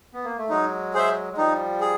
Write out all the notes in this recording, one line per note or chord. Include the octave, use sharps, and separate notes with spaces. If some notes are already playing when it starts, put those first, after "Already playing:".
B3
A#3
A3
F#3 G#3 D#4
G#4 C5 E5
G#3
F3 G3 D#4
G#4